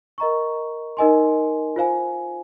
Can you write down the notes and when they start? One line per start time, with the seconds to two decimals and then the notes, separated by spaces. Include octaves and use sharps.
0.18 A#4 D#5 A#5 C#6
0.97 D#4 A#4 D#5 G#5 C6
1.76 F4 C5 F5 G#5